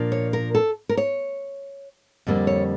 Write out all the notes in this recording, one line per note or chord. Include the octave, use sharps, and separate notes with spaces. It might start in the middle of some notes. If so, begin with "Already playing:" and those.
Already playing: A#2 F3 A#3 D4
C#5
A#4
A4
A#4
C#5
F2 D3 G3 A#3
C#5